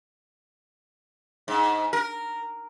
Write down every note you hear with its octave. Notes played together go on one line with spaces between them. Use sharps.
G#2
A#4